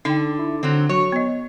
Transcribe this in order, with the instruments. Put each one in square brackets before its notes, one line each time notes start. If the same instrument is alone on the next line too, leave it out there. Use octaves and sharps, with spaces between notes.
[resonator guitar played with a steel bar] D3 [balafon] D#4 G5
[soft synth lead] E4
[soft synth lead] D3 [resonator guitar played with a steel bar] F#3 C4
[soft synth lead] F#3 [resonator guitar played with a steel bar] C#5
[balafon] B3 D#5